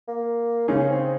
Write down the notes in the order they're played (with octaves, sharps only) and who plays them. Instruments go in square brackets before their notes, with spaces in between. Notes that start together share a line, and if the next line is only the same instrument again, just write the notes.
[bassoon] A#3
[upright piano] C#3 G#3 D#4 G#4 [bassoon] C#4
[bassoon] C4